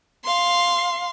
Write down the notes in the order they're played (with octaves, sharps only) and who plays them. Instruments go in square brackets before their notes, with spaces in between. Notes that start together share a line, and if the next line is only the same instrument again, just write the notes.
[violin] F5 C6